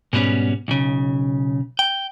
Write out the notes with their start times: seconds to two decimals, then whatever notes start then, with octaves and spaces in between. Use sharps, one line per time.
0.13 G#2 B2 G3 B3 C#4
0.68 B1 C#3
1.79 G5